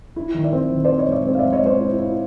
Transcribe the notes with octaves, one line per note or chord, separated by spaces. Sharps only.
E4
D#3
D5 E5
C4
D#3
C5 D5
C4
C#5 D#5
G#3 D5 E5
C4
F5
D5 E5
G#3
C#5 D#5
G#3 C5 D5
E4
E4